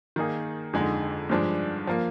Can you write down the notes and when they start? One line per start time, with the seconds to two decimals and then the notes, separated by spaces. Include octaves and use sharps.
0.16 D#3 A#3 D#4 G#4
0.73 F2 D3 G#3 D#4
1.29 G2 F3 G#3 D4
1.87 F3 A#3